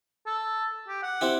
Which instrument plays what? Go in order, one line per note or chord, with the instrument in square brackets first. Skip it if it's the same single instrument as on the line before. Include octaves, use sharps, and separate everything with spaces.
[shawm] A4
G4
F#5
[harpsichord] C4 E4 G4